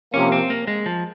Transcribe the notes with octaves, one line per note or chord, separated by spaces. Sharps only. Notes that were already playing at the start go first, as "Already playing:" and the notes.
C3 F3 A#3 C#4
C4
A#3
G#3
F3